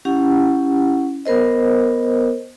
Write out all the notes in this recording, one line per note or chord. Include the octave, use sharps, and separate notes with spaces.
C#4 E4 G4 F#5
B3 A#4 C5 D#5